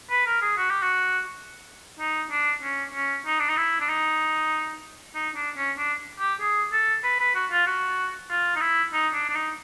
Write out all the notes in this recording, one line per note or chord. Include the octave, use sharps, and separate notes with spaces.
B4
A#4
G#4
F#4
G4
F#4
D#4
D4
C#4
C#4
D#4
D4
D#4
E4
D4
D#4
D#4
D4
C#4
D4
G4
G#4
A4
B4
B4
F#4
F4
F#4
F4
D#4
E4
D#4
D4
D4
D#4